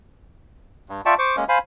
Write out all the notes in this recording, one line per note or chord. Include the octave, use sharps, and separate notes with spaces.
G2
F4 D5 E5 G5 A5 C#6
C5 C#6 D6
G#3 A#3 C#4
C5 F5 G#5 B5